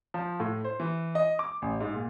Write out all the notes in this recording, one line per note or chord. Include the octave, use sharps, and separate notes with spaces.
F3
A2
C5
E3
D#5
D6
A1
G#2
A#2